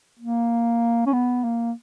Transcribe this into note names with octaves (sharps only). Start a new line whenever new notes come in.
A#3
C#4
B3
A#3